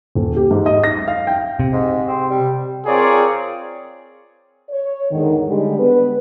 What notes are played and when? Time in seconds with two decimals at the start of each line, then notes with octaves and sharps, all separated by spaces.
0.15 D#1
0.36 G4
0.51 G#2
0.66 D#5
0.84 A#6
1.08 F5
1.27 G5
1.60 C3
1.72 G#2
2.08 C4
2.31 G3
2.86 C4 F4 G#4 A#4 C#5 D5
4.70 C#5
5.11 E2 G#2 D3 D#3
5.48 D3 G3 G#3
5.79 B3 B4